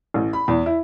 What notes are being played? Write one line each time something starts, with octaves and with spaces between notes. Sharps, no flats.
A1
B5
E2
E4